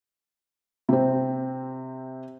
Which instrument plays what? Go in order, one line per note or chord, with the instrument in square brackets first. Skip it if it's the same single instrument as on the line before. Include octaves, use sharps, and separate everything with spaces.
[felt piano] C3 C4